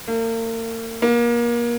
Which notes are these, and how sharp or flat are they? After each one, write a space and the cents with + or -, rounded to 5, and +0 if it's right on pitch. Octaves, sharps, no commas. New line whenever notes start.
A#3 -40
A#3 +30